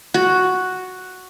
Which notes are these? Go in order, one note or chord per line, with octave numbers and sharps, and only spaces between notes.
F#4